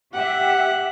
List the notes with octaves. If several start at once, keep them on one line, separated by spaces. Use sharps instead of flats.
G4 E5 F#5